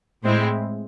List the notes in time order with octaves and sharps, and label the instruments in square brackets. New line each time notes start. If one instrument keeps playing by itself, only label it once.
[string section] A2 G#3 C4 E4